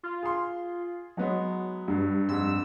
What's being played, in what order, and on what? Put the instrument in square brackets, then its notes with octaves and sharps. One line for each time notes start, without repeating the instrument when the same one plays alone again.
[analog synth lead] F4
[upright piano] G#4 C6
[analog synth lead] F#3 [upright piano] G#3 B3 D#4
[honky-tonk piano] G2
[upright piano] F2 G#2 [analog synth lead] E6